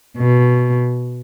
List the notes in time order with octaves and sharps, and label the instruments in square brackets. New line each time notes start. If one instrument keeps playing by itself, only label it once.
[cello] B2